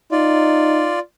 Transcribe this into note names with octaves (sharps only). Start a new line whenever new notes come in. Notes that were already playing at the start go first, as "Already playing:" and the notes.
D#4 F4 D5